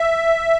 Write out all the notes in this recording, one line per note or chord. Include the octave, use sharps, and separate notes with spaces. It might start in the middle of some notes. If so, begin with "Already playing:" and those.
Already playing: E5